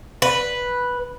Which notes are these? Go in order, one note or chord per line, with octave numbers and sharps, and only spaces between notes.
B4